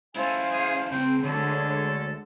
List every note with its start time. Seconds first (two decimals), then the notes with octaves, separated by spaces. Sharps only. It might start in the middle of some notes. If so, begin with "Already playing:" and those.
0.16 C#4 E4 A4 C5 F5 G#5
0.51 G#4
0.92 C#3 C4 G5 C6
1.24 D2 D3 G#3 A4 C#5